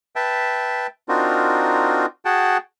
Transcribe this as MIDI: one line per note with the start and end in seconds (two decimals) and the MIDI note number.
0.16 0.87 71
0.16 0.87 76
0.16 0.87 79
0.16 0.87 81
1.09 2.06 60
1.09 2.06 62
1.09 2.06 63
1.09 2.06 65
1.09 2.06 66
1.09 2.06 70
2.25 2.57 66
2.25 2.57 68
2.25 2.57 78
2.25 2.57 79
2.25 2.57 81